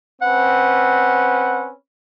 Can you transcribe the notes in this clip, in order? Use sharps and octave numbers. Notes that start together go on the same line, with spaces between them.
C4 C#4 B4 F#5